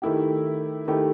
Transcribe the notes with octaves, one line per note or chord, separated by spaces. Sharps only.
D#3 A3 E4 G4
D#3 A3 E4 G4